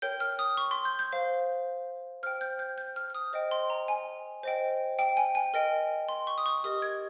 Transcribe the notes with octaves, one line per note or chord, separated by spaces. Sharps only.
A#4 C#5 G5 G6
F6
D#6
C#6
C6
G6
G6
C5 F5
C5 G5 F6
G6
G6
G6
F6
F6
D#6
C5 D#5 G5
C6
A#5
G#5
C5 D#5 G5
G5
G#5
G#5
A#4 D#5 G5
C6
C#6
D#6
C#6
G4 A#4 D#5 D#6
G#6